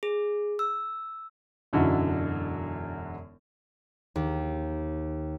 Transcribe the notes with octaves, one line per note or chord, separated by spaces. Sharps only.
G#4
E6
E1 F#2 D3 D#4 E4 F#4
D#2